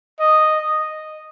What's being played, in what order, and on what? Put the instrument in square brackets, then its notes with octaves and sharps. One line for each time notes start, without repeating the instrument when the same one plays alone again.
[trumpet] D#5